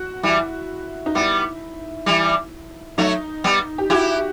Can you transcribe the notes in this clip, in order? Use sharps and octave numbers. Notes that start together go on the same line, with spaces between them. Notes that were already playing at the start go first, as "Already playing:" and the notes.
Already playing: F#4
E3 G3 E4
D#4
G3 B3 E4
E3 G3
F#3 A3 D#4
G3 B3
G4
E4 F#4 G4